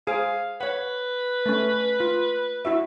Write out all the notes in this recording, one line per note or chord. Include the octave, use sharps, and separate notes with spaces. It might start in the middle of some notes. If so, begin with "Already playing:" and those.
G#4 C5 F5
B4 C#5 F#5
A3 C#4
F4
E4 F#4 E5